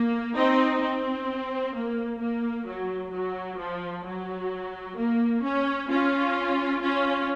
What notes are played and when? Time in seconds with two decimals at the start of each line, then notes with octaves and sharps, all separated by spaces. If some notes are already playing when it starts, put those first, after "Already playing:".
Already playing: A#3
0.35 C4 D#4
0.81 C4
1.74 A#3
2.20 A#3
2.66 F#3
3.12 F#3
3.58 F3
4.05 F#3
4.97 A#3
5.43 C#4
5.89 C#4 F4
6.82 C#4 F4